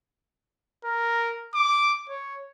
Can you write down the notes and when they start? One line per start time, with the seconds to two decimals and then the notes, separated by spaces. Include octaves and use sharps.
0.85 A#4
1.55 D6
2.10 C#5